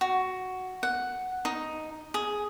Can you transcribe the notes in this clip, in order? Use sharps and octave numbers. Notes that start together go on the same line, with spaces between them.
F#4
F#5
D#4
G#4